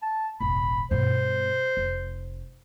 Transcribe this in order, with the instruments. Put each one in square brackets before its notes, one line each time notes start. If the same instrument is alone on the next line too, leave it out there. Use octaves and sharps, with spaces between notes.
[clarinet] A5
[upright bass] E1 A1 [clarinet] B5
[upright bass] G2 B2 [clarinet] C5
[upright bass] F1